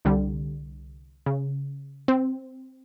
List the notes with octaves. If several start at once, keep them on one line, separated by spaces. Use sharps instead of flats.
C2 D3 G3
C#3
C4